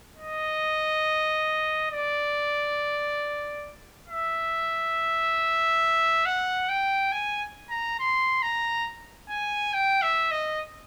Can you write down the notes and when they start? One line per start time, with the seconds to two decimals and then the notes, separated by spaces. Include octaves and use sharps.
0.17 D#5
1.91 D5
4.08 E5
6.25 F#5
6.69 G5
7.12 G#5
7.70 A#5
8.00 C6
8.42 A#5
9.30 G#5
9.73 G5
10.02 E5
10.31 D#5